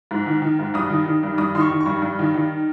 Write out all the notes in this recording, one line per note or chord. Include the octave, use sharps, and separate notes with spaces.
G#2
D#3
D#3
G#2
G2 D#6
D#3
D#3
G2
G2 D#6
D#3 C6
C#6
D#3
C#6
G2
G2
D#3
D#3